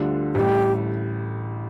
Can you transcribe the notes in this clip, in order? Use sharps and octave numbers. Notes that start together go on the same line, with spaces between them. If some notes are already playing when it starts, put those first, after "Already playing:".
Already playing: D2 D3 G3 D4 F4
A1 A2 G3 G4